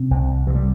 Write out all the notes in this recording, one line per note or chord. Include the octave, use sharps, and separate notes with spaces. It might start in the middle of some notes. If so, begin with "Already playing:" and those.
Already playing: C3
C2
C3 E3
G3